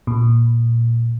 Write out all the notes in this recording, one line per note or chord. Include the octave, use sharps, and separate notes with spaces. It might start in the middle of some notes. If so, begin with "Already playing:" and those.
A#2